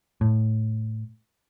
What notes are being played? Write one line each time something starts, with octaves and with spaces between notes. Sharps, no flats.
A2